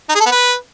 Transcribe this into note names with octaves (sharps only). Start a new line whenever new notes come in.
D#4
G#4
A4
B3
B4